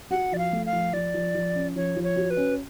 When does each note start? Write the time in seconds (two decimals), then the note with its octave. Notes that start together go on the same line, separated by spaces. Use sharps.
0.11 F#4 F#5
0.32 F3 D5
0.38 F5
0.53 A3
0.66 F5
0.73 F3
0.93 F3 D5
1.14 F3
1.35 F3
1.55 C#4
1.75 F3 C#5
1.96 F3
2.03 C#5
2.16 F#4
2.30 B4
2.37 C#4